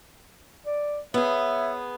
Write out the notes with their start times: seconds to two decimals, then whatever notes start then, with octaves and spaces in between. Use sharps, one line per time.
0.66 D5
1.14 B3 G#4 C#5 E5